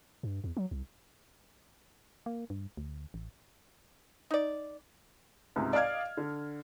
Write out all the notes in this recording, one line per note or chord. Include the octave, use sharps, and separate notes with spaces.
G2
E2
F#3
C2
A#3
G2
D2
A1
D#4 D5
C#2 G#2 C3
D5 D#5 F5 F6 G#6
D3